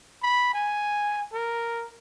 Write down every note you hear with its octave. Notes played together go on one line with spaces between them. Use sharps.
B5
G#5
A#4